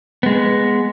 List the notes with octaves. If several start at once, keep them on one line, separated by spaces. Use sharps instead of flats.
G#3 B3